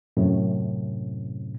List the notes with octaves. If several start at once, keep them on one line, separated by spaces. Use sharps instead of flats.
F#2 A2 C3